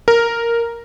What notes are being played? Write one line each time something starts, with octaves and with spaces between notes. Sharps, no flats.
A#4